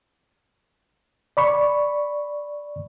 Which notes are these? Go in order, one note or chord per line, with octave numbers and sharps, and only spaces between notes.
D5 B5 C#6